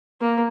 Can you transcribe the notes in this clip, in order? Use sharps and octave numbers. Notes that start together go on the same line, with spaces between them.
A#3